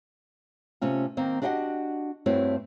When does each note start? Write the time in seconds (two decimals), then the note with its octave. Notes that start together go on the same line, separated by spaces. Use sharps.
0.81 C3 A3 C#4 F4
1.17 D#3 A#3 C4
1.42 D4 F#4 G4 D#5 F5 F#5
2.26 G2 A3 C4 E4 F#4 C#5